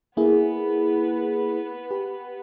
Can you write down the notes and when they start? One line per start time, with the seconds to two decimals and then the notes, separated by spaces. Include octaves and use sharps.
0.17 A#3 B3 E4 G#4 B4
1.91 G4